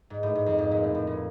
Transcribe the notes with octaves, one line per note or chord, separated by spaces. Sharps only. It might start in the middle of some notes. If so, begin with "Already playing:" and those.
G#2
A2
G#2
F2
G#2
A#2
A2
A2
A#2